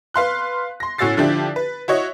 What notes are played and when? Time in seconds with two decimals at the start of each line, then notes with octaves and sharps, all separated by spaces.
0.14 B4 F5 C6 F#6
0.80 C6 A#6
0.98 A2 C#4 F#4 E6 A6 C7
1.17 D3 F3 D4 E4 G4
1.56 B4
1.88 E4 F#4 C#5 D#5